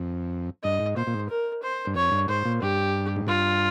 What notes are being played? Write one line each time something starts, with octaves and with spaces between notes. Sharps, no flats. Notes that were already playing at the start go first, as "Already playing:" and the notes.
Already playing: F2
G2 D#5
G#2
A#2 C5
A#2
G#2
A#4
C5
G2
F2 C#5
G2
G#2 C5
A#2
G2 G4
G#2
G2 F4